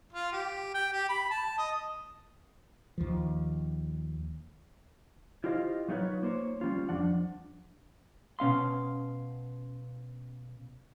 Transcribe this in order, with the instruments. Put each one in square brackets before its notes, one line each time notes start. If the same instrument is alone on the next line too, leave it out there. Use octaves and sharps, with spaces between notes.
[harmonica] F4
G4
G5
G4
B5
A5
D#5
[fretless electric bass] D#2 F3
[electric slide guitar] E4 F4 G4 C5 D#5 F5
F#3 A3 D#4 F4 B4 C#5
A#3 C5 C#5
G3 G#3 C#4 F4
F2 F3 D4 F#5
[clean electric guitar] B2 C#4 F5 C6